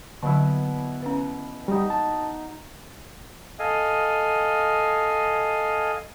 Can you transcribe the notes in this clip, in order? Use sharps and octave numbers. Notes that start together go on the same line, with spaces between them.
B2 D3 F#3 E4
C#4 B4
G3 D#4 F#4
A5
A4 D#5 F5 G#5